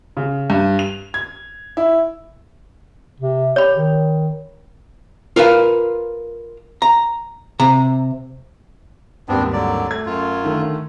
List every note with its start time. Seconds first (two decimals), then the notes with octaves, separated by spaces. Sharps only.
0.17 C#3
0.50 G2
0.79 F7
1.14 G#6
1.77 E4
3.20 C3
3.56 G4 C#5 B5
3.77 D#3
5.36 F4 A#4 B4 F5
6.82 A#5
7.60 C3 A#5
9.28 G#1 D#2 G3 B3 C4 D4
9.53 D3 F#3 D5
9.90 A3 G#6
10.06 F#2 F4
10.44 D3 D#3 A3